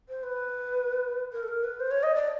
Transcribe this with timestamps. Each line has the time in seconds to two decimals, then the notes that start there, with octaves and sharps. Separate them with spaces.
0.09 C5
0.23 B4
1.33 A#4
1.43 A4
1.48 A#4
1.64 B4
1.80 C5
1.91 C#5
2.03 D#5
2.15 D5